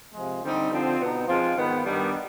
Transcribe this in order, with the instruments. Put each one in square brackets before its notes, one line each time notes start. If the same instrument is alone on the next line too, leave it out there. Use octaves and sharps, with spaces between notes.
[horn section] C3 F3 G#3
D3 G3 C4 D#4
D3 F3 C4
B2 B3 D#4
F3 G#3 C4 F4
G#2 D#3 B3
G2 D#3 G3 B3 D4